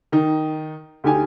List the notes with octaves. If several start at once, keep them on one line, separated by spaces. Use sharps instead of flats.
D#3 D#4
D2 D#4 G4 G#5